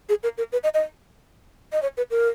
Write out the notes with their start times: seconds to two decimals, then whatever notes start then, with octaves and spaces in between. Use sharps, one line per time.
0.09 G#4
0.23 A#4
0.38 A#4
0.52 B4
0.63 D#5
0.74 D#5
1.72 D#5
1.82 C#5
1.97 B4
2.11 A#4